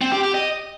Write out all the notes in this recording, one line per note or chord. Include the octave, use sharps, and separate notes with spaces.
C4
G4
G4
D#5